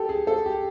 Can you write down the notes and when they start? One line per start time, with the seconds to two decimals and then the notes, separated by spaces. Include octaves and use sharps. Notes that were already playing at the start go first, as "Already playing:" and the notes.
Already playing: G4 A4
0.09 G#4
0.27 A4
0.46 G4